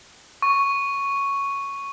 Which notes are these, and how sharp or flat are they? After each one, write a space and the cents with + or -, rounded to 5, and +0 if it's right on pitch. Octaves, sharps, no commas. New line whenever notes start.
C#6 +0